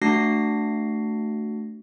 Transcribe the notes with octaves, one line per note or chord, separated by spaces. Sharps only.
A3 D4 F#4 A#6 C7